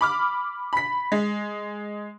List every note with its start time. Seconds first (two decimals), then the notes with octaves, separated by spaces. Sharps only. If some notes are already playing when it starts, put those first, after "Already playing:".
0.01 B5 D6 F6
0.73 B5 B6
1.12 G#3